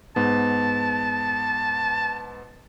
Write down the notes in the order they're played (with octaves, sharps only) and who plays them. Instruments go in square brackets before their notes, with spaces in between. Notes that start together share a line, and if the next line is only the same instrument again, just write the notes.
[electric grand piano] G#2 B3 [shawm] A5